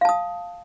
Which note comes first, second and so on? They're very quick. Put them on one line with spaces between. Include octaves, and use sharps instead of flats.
F5 A5 D#6